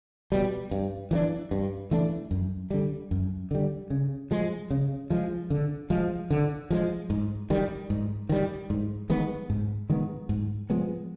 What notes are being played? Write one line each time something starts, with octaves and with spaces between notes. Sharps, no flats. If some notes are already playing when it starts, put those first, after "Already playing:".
B2 G3
G2
E3 A3 D4
G2
E3 A3 D4
F#2
D3 G3
F#2
D3 G3
C#3
F3 G#3
C#3
F3 G#3
D3
F3 G#3
D3
F3 G#3
G#2
D#3 G3
G#2
D#3 G3
G#2
D#3 G#3 B3
G#2
D#3 G#3 B3
G#2
F3 G#3 B3